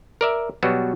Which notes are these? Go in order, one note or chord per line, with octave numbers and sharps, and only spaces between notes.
A#4 D5 E5
B2 F#3 G3 B3 F#4